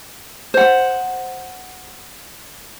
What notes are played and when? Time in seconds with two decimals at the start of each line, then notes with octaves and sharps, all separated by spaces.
0.54 C5 F#5